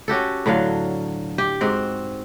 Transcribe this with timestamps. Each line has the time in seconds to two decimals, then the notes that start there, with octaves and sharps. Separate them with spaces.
0.08 C#4 F#4 G4 A4
0.46 A2 D3 F#3 F5
1.38 G4
1.61 G#2 C4 F#4